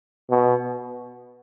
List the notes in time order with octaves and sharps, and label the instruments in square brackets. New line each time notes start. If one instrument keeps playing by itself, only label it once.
[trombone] B2